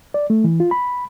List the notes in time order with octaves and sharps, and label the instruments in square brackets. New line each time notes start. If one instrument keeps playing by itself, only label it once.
[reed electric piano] D5
A3
E3
F4
B5